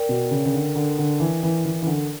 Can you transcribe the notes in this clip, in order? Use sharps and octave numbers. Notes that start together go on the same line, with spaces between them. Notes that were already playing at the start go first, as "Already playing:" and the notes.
Already playing: A#4 D5 G5
B2
C#3
C#3
D3
D3
D3
E3
E3
E3
E3
D3